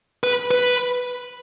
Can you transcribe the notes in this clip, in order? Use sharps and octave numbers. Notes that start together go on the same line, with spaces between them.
B4
B4